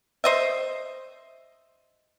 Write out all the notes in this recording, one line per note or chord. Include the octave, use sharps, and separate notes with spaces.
C5 D#5 E5